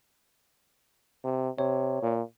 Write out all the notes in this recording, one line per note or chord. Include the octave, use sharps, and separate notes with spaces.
C3
C3 C#5
A#2